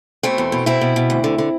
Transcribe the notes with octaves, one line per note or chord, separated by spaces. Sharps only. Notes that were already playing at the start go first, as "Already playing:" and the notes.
B2 A3 C4
E2
B2
B2 C4 E4
B2
B2
D2
D3
D3